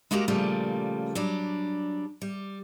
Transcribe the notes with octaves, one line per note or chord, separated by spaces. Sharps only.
G#3 A#3 F#4 G4 A#4
A#2 C#3 F3 G3 A3 A#3
F#3 G3 D4
G3